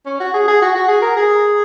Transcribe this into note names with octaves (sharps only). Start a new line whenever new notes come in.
C#4
F#4
G#4
G#4
F#4
F#4
G#4
A#4
G#4